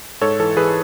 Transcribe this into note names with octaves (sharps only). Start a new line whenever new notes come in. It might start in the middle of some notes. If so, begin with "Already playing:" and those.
G#2 A4 C#5
E3 A4
E3 G#4 B4